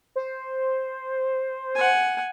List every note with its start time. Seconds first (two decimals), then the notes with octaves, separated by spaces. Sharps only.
0.16 C5
1.75 F#5 G#5